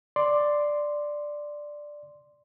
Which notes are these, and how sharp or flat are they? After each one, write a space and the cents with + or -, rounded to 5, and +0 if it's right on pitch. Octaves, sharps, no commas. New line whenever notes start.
D5 +5 C6 +0